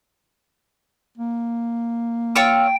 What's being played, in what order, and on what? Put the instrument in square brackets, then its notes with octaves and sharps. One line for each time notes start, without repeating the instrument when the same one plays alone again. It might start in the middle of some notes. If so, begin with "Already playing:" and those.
[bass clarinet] A#3
[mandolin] F4 C#5 E6 [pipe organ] G5